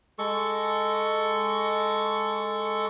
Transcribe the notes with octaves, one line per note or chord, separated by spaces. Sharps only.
G#3 A4 C#6